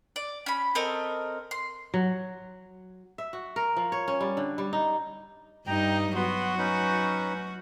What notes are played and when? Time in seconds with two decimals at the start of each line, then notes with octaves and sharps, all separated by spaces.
0.16 D5
0.46 C#4 B5
0.75 C4 A4 A#4 D#5
1.51 C6
1.94 F#3
3.18 E5
3.33 F#4
3.56 A#4
3.77 F3
3.92 C#5
4.08 C#4
4.21 G3
4.37 D3
4.58 G3
4.73 D#4
5.67 G2 D#4 G5 A#5
6.15 F#3 B3 F#4 B4 C6
6.58 C#4 D#4 B4